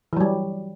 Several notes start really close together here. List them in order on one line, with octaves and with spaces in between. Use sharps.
E3 F#3 G3